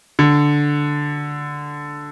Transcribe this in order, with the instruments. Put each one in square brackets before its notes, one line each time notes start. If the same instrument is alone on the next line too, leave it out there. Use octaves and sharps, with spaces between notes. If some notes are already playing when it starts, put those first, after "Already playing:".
[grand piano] D3